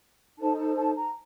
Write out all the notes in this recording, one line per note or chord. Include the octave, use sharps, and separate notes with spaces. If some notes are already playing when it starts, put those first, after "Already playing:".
D#4 A4 C5 A5
A5
A5
A#5